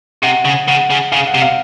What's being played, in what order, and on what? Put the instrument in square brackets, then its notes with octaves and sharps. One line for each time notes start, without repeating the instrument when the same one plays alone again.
[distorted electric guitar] C3 [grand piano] F#5
[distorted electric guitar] C#3
[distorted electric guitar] C#3 [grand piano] F#5
[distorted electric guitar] C#3
[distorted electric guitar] C#3 [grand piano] F5
[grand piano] F#5
[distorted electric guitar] C3
[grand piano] F5